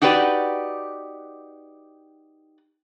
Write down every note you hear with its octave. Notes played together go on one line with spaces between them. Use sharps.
D#4 F#4 G4 B4 D5